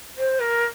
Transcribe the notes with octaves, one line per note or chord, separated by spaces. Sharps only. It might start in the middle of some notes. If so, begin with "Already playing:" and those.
C5
A#4